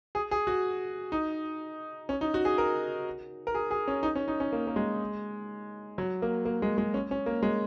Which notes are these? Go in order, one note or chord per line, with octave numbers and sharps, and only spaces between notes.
G#4
G#4
F#4
D#4
C#4
D#4
F#4
G#4
A#4
A#4
G#4
G#4
C#4
D#4
C#4
D#4
C#4
A#3
A#3
G#3
F#3
A#3
A#3
G#3
G#3
C#4
C#4
A#3
G#3